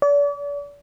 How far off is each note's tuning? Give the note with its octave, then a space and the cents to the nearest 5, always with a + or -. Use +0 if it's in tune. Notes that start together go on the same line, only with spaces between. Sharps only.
D5 -40